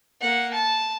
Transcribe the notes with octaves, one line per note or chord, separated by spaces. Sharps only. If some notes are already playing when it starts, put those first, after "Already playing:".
A#3 F#5
A5